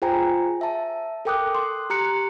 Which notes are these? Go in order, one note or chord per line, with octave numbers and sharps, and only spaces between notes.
F4 G#4 C5 G5 G#5 A#5
E5 A5
A4 A#4 G5 D6 D#6 F#6
C6
G4 A#5 F#6 C#7